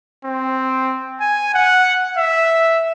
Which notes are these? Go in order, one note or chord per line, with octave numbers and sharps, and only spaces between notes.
C4
G#5
F#5
E5